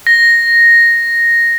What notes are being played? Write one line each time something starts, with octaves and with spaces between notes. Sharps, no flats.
A#6